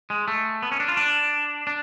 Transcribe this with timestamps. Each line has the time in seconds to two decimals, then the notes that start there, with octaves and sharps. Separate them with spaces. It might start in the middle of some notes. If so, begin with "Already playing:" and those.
0.10 G#3
0.28 A3
0.62 B3
0.72 C#4
0.80 D4
0.88 F4
0.97 D4
1.67 D4